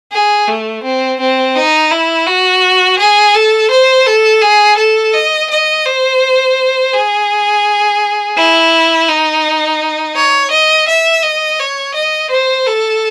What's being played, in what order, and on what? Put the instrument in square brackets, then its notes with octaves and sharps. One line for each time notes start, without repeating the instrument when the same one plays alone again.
[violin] G#4
A3
C4
C4
D#4
E4
F#4
G#4
A4
C5
A4
G#4
A4
D#5
D#5
C5
G#4
E4
D#4
C#5
D#5
E5
D#5
C#5
D#5
C5
A4